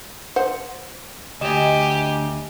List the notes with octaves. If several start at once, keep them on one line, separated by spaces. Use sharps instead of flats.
C5 F#5
D2 G4 D#5 G#5 E7